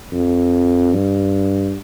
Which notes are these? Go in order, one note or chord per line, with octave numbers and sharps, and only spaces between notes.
F2
G2